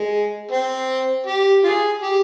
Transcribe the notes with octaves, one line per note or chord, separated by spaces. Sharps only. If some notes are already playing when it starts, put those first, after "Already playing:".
Already playing: G#3
C4
G4
F4 G#4
G4